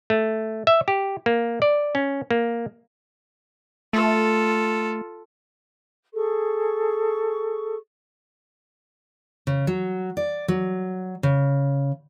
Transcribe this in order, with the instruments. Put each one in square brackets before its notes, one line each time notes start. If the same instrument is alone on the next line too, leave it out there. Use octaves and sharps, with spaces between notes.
[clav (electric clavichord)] A3
E5
G4
A#3
D5
C#4
A#3
[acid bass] A3 [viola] F4 A4
[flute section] G#4 A4 C#6
[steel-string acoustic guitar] C#3
F#3
D5
F#3
C#3